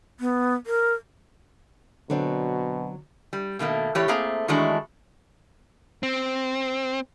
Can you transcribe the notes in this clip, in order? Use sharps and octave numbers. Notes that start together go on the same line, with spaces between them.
B3
A#4
B2 D3 F#3 C4 D4
G3
B2 D#3 A3 A#3
A2 E3 G4 C#5 D5
A3 A#3 C4 G#4 A#5
D#3 E3 G#3 A3 D4 F#4
C4